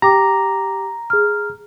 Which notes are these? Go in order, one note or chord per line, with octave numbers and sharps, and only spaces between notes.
G4 G5 A#5 D6
G#4 F6